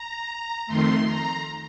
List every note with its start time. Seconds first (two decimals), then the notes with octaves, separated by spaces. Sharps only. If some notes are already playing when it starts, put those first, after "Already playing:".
Already playing: A#5
0.67 F2 D#3 A3 C6
1.06 A#5